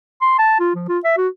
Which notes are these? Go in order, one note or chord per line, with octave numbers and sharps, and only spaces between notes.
C6
A5
F4
F3
F4
E5
F#4